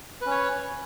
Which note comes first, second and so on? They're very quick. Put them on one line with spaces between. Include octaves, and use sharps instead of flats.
B4 C#4 C#5